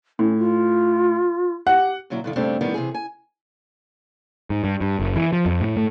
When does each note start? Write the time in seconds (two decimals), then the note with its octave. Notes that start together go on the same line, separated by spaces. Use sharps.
0.19 A2 C#4
0.38 F4
1.67 G4 F#5
2.10 A#2 D3 F#3 E4
2.24 G2 D3 D#3
2.36 G2 C#3 A3 C4 D4 G4
2.61 A2 D#3 G3 B3
2.74 C3 E3 G#4
2.94 G#5
4.50 G#2
4.64 G2
4.81 G2
5.00 F#1
5.16 E3
5.33 F3
5.46 F2
5.61 A2
5.77 A2